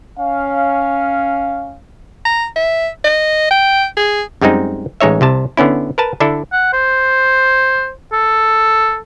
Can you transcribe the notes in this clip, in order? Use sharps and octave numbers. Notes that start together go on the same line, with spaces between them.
C#4 F5
A#5
E5
D#5
G5
G#4
F#2 G3 G#3 C4 D#4
A1 G#3 D#4 C#5 E5
C2 C3 A5
D3 B3 C#4 E4
A#4 B4 A5
D3 D4 E4 A4
F#5
C5
A4